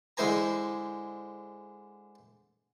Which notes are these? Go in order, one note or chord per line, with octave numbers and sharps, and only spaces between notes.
D3 G#3 E4 C5 G#5 A#5